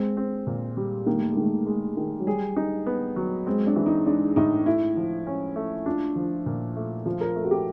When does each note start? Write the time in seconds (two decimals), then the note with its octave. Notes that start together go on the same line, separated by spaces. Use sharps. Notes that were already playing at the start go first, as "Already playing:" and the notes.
Already playing: G#3 C4
0.17 C4
0.47 A#2
0.77 G3
1.06 D#3 A#3
1.18 A3
1.31 G#3
1.37 D#3
1.43 A3
1.66 G#3
1.97 D#3
2.20 F#3
2.27 G3 G#4
2.56 D#4
2.86 B3
3.16 F#3
3.46 G#3 C4
3.67 D4
3.76 E3
3.86 D#4
4.06 G#3 D4
4.36 A2 D#4
4.66 A3 E4
4.97 F3
5.27 C#4
5.56 A3
5.86 D4 F4
6.16 F3
6.46 A#2
6.76 A3
7.05 F3 F4
7.21 A#4
7.36 A3 A4
7.44 F#4
7.51 G4